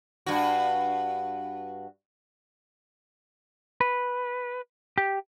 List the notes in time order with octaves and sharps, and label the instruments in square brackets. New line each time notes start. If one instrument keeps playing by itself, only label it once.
[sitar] G2 F#4
[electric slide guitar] B4
G4